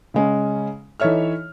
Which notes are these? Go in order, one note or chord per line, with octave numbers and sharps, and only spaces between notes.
C#3 G#3 C#4
E3 D#4 A4 C#5 E5 F6